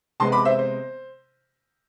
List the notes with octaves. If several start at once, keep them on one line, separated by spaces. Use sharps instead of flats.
C3 G#3 B3 A5 C6
B5 D6
C5 E5
C5